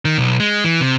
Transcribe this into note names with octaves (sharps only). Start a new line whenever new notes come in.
D#3
B1
G#3
E3
C3